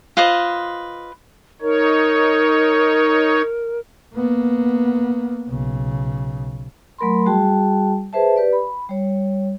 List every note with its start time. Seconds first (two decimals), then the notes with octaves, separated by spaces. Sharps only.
0.17 F4 B4 C5 D#5
1.62 D#4 A#4 C#5
4.14 A#3 B3
5.48 B1 C#3
6.98 F#3 A3 A#4 B5 C6
7.26 G3 F#4 G#4 G5 A5
8.13 G#4 B4 C5 E5 A5
8.36 G4 B4 D5
8.53 B5
8.89 G3 C#5